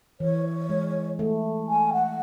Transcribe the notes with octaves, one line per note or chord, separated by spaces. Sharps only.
E3 C#5
G#3
A3
G#5
F#5